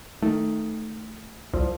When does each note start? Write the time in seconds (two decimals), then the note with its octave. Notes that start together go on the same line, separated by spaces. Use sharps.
0.22 D#3 A3
1.54 C2 F3